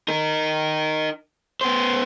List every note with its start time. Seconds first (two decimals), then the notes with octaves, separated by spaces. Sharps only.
0.08 D#4 A#4
1.61 B3 C5